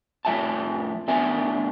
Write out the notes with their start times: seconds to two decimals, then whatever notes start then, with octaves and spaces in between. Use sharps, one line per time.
0.25 F2 A2 F3 E5 G#5 A5
1.08 A2 B3 D4 E5 G#5